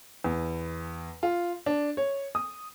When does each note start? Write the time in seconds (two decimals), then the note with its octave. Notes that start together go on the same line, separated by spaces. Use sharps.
0.24 E2
1.23 F4
1.66 D4
1.97 C#5
2.35 D#6